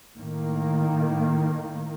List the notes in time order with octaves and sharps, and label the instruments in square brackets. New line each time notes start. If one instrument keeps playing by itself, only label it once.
[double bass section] A2 D#3 A#3